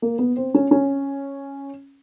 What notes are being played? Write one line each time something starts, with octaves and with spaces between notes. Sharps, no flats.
A#3
B3
C4
C#4
C#4